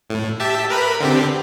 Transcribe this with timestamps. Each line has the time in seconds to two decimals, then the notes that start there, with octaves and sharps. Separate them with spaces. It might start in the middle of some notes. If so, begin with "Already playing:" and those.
0.10 A2
0.40 G4 E5 A5
0.70 A#4 B4 B5
1.00 D3 C4 G4